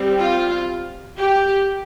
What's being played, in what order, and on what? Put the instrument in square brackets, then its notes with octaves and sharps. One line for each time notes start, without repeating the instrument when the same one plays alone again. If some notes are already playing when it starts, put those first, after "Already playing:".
Already playing: [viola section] G3 C4
F4
G4